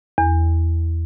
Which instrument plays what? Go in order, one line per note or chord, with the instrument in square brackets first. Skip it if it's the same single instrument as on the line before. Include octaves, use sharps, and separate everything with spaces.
[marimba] E2